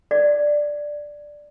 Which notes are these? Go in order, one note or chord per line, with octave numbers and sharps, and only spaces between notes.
D5